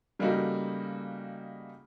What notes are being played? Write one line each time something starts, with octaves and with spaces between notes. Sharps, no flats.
C#3 G3 A3 A#3 D#4 F#4